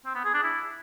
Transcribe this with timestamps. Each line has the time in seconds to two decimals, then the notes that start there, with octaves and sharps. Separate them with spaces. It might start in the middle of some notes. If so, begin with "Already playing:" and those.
0.06 C4
0.15 B3
0.25 G#4
0.34 D4
0.43 E4